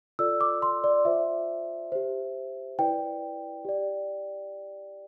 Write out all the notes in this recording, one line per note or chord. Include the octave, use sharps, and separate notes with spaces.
F4 A4 D5 E6
D6
C6
D5
F4 C5 E5
G4 C5
E4 B4 D5 G5
G4 D5